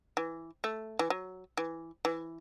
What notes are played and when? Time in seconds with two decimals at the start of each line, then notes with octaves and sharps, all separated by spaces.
0.17 E3
0.64 A3
0.99 E3
1.10 F#3
1.57 E3
2.05 E3